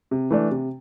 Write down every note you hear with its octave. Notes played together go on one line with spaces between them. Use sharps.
C3
E3 A3 D4
C3